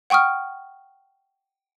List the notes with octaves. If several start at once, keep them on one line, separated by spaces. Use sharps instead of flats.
F#5 G5 C#6 D#6 F6